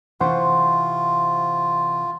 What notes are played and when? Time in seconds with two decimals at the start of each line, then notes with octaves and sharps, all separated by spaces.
0.21 C3 E3 F4 C5 F#5 C6 C#6